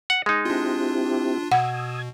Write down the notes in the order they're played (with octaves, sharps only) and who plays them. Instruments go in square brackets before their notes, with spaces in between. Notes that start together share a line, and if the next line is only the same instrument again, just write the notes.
[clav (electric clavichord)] F#5
G#3 D#4
[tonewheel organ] C4 E4 G4 [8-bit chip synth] D4 F4
[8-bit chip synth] B2 [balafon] F#5 [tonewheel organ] D#6 E6 G#6